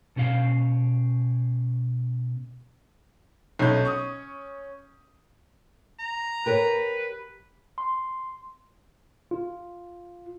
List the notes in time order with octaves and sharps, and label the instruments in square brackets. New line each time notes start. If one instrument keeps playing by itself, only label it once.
[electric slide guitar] B2 C#4 G4 F5
[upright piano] B1 G6 [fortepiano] C#4
[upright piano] C#6 D#6
[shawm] A#5
[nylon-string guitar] G4 A#4 C#5 [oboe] B4
[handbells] C6
[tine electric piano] F4